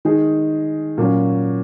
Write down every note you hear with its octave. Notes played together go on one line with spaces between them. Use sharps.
D#3 G#3 D#4 G#4
A#2 F#3 C#4